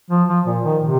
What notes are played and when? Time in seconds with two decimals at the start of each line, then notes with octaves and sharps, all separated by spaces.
0.10 F3
0.28 F3
0.47 A#2
0.64 D#3
0.82 C3